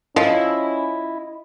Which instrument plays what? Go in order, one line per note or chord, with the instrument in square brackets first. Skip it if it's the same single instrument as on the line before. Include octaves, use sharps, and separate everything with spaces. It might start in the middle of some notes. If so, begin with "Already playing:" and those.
[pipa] F3 [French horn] C#4 [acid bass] E4 [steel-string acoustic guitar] D#5